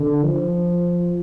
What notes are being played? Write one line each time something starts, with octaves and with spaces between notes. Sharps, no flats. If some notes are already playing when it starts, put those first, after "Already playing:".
Already playing: D3
F3